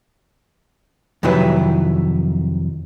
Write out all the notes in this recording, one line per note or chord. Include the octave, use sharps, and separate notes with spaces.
F2 C3 D#3 F#3 E4 B4